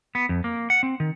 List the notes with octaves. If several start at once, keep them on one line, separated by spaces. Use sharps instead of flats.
B3
F2
A#3
F#5
C4
D#3